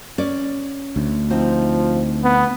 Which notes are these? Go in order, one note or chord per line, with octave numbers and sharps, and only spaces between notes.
C#4 D5
D2
F3 C4 D#4
B3